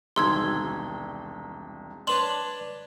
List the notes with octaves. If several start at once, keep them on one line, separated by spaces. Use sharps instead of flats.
E1 C2 D#3 C6 E6 G#6
D4 B4 C#5 C6 F#7